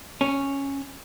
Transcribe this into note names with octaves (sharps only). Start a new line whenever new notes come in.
C#4